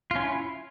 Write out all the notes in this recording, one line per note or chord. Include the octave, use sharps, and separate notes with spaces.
C#4 E4 F4